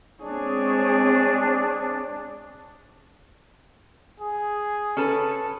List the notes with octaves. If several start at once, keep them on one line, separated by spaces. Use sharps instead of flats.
G#3 C4 D4 G#4 C#5
G#4
C#4 A4 B4